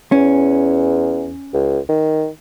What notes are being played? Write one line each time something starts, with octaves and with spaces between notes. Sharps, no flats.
E2 C#4
C#2
D#3